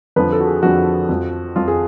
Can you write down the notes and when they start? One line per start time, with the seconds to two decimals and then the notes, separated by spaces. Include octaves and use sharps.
0.16 F2 D3 F3 B4
0.32 A4
0.40 F#4
0.47 G#4
0.63 F2 D3 F3 F#4
1.09 F2 F3
1.56 F2 F3 F4
1.68 G#4